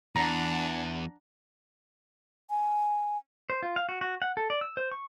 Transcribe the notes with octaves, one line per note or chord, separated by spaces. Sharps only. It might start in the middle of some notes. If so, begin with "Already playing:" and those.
E2 D4 F#5 A#5
G#5
C5
F4
F5
F#4
F#4
F#5
A4
D5
E6
C5
C#6